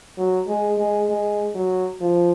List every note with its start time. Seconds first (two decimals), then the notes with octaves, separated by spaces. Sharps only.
0.18 F#3
0.48 G#3
0.78 G#3
1.09 G#3
1.55 F#3
2.01 F3